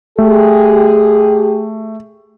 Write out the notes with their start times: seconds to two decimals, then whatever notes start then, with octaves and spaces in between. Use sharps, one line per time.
0.18 A3 G4 G#4